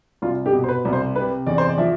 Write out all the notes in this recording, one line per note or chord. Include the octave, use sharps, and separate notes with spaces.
C2 F4
G4
B2
C5
B4
C2
C5
C3 B4
E2 D5
C5
D5
F3 E5